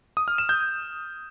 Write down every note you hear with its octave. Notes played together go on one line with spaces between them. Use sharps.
D#6
F6
E7
G6